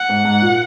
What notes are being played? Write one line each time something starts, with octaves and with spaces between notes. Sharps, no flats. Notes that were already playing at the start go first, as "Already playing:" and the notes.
Already playing: F#5
G#2
G#2
A#2